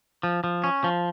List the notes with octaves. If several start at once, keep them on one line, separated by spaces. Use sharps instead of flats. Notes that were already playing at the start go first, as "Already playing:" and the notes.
F3
F3
C#4
F3